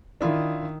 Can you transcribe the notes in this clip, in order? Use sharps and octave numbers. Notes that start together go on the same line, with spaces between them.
D#3 D4 E4 F4